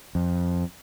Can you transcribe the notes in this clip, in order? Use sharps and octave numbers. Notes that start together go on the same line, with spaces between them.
F2